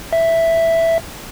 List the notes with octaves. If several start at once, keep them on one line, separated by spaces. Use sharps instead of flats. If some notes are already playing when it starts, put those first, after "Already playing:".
E5